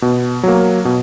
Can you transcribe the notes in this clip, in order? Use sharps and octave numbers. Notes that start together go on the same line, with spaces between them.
B2
F#3 A#3
B2